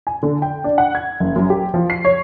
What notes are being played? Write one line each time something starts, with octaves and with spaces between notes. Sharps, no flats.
G#5
D3
G5
D4
F#5
G#6
F#1
F#2
G4
F3
C7
C#5